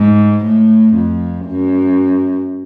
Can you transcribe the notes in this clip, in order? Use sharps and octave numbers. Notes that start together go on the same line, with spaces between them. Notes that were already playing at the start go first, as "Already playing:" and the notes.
Already playing: G#2
A2
F2
F#2